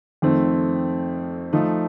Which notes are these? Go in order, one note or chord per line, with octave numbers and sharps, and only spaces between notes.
F2 D#3 A3 C4
F3 A3 D#4